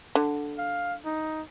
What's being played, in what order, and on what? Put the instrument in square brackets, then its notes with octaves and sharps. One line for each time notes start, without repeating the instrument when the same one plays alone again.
[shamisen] D3
[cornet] F5
D#4